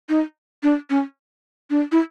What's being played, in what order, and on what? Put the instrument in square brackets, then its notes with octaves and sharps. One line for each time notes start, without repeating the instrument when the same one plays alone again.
[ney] D#4
D4
C#4
D4
E4